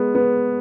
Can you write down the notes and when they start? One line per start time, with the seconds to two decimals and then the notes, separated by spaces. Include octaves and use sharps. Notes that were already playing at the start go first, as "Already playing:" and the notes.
Already playing: G#3 B3
0.15 B3